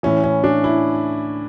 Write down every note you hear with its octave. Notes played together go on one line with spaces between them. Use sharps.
A2 E3 C#4
C#4
D4
E4